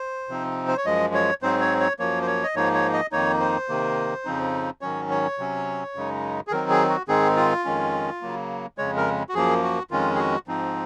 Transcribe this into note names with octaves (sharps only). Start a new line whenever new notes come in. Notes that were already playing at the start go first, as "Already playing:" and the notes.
Already playing: C5
C3 F3 C4 D#4
C5
C#5
F#2 F3 G#3 D#5
C#5
G#2 F#3 C4 D#4 C5
C#5
C#5
F#2 F3 A#3 C#5
C5
C#5
D#5
G#2 F3 A#3 D#4 C#5
C#5
D#5
F2 D#3 A#3 D#4 C#5
C5
C3 D#3 A#3
F2 C#3 F3 C4 D#4
G#2 D#3 F#3 C#4 C#5
C#5
C3 F#3 C#4
F#2 C#3 G#3 D#4
G#4
D#3 F#3 C4 D#4 A#4
G#4
F#4
G#2 D#3 G#3 C4 D#4 G#4
F4
F2 D#3 G#3 C#4
C#3 F#3 A#3
F2 C#3 G#3 C#5
A#4
F#4
F#2 F3 A#3 G#4
F#4
F2 D#3 G#3 C#4 F4
G#4
F#4
G#2 F3 C4 D#4